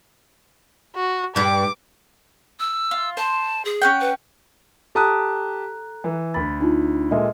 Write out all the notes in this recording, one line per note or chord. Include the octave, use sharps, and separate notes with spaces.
F#4
G2 G3 D6
E6
F4
C5 A5
G#4
C#4 F#5 G5
B4
G4 A4 A5 A#5 D#6 F#6
E3
D2 B5 A6
D4 D#4 F4
A#2 G#3 A4 D#5 E5